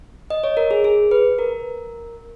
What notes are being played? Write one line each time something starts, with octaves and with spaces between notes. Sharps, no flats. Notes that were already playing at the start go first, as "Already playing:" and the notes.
D#5
C#5
A#4
G#4
G#4
B4
A#4